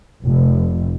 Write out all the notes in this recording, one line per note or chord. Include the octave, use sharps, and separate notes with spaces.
F1